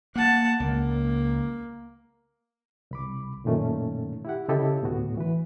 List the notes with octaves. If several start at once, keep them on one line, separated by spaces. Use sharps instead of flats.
A#3 F#5 A5
C#2 A#3
C2 B5 D6
F#2 A#2 D#3 A3 C#4
E4 G4 F#5
C#3 E4 G4 A4 D#5
D2 A2 B3 F#4
E3 B4